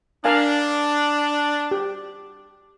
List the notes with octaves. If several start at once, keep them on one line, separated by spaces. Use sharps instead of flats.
D4 A#4 F5 G#5
G4